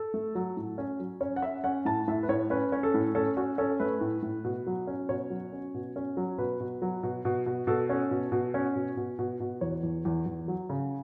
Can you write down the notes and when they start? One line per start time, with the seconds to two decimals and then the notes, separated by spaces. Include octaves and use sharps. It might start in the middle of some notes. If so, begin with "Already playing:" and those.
Already playing: A4
0.14 A3
0.35 F#3
0.57 A2
0.78 C#4
1.00 F#3
1.21 C#4 C#5
1.36 F#5
1.42 C#4 E5
1.64 C#4 F#5
1.85 A2 A5
2.08 A2 E5
2.23 B4
2.29 A2 C#5
2.50 C#4 B4
2.72 C#4
2.83 A4
2.94 A2
3.15 C#4 A4
3.37 C#4 F#4
3.58 C#4 A4
3.80 A3 B4
4.01 A2
4.22 A2
4.44 B2
4.67 F#3
4.87 C#4
5.09 B2 C#5
5.30 F#3
5.52 C#4
5.74 B2
5.96 C#4
6.17 F#3
6.38 B2 B4
6.60 B2
6.82 F#3
7.03 B2
7.25 B2
7.46 B2
7.67 B2 A4
7.89 C#4
8.11 B2
8.32 B2
8.54 C#4
8.75 B2
8.97 B2
9.19 B2
9.40 B2
9.61 E2 C#5
9.83 E2
10.05 E2
10.26 E2
10.48 F#3
10.69 C#3